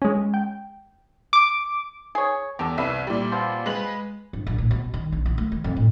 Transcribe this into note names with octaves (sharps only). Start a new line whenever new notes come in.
G#3 C#4
G5
D6
G#4 C#5
E2 G4 A4
C2 B4 E5
A#2 G3
B2 C4 F4
G#3 B4 F#7
G1
A#1
A2
B2
D#3
A#1
E3
A3
D#3
F2
A2